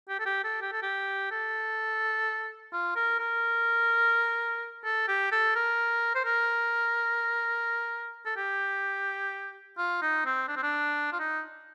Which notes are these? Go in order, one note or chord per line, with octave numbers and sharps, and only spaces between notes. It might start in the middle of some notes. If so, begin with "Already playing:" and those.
G4
A4
G4
A4
G4
A4
G4
A4
F4
A#4
A#4
A4
G4
A4
A#4
C5
A#4
A4
G4
F4
D#4
C4
D4
C4
D4
F4
D#4